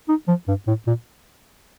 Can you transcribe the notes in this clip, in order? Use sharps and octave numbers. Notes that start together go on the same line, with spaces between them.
D#4
F3
G2
A2
A#2